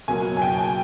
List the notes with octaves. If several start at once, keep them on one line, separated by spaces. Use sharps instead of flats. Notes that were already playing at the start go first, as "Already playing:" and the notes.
C#2 B2 F#3 A#3 G#5
G#5
G5
A5
G#5